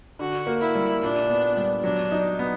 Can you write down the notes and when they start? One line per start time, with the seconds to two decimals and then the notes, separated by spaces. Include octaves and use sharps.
0.19 D3 F#4
0.47 A#3
0.61 E4
0.75 G3
1.02 A#2 D4
1.30 B3
1.57 G3
1.84 F#3 D4
2.12 D#4
2.39 B3